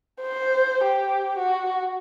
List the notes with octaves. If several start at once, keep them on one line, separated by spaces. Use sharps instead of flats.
C5
G4
F#4